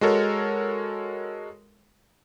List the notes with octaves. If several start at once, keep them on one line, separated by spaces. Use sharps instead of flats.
G#3 F#4 A4 A#4 C#5